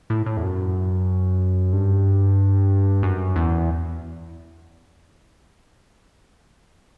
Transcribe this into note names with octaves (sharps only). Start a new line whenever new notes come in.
A2
A2
E2
F#2
G2
F#2
E2